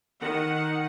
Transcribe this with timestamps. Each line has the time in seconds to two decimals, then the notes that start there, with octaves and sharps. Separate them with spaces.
0.20 D#3 F#5